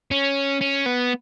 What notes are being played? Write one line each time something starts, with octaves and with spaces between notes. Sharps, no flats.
C#4
C#4
B3